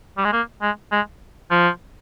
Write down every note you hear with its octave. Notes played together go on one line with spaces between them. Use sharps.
G3
G#3
A#3
G#3
G#3
F3